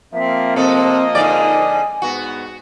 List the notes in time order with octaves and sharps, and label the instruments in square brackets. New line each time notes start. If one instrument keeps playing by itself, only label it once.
[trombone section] F3 A#3 [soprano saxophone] C4 [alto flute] E5
[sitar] C3 A4 [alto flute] C4 [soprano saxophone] D#5
[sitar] G#2 D3 D5 [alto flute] G#5
[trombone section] G#2 B3 [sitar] F#4